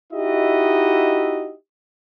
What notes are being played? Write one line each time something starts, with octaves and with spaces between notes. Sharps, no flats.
D#4 E4 F#4 G4 D#5 E5